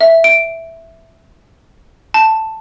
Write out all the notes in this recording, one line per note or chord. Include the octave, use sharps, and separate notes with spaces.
E5
D7
A5